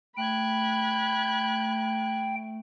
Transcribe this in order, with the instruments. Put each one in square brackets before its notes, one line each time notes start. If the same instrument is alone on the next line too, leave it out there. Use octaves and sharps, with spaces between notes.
[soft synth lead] A3 [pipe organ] G5 [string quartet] B5 F#6 G#6